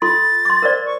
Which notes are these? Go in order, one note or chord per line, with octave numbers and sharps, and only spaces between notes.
F4 A4 C6 A6
C6 D6
A#4 C5 D5
C#6